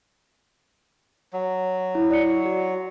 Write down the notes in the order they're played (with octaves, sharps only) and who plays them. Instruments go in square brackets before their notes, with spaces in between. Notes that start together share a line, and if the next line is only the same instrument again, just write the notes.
[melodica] F#3
[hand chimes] E4
D5 C#7
F#4